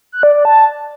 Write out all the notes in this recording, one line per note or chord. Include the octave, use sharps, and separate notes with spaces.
F#6
D5
D5
A5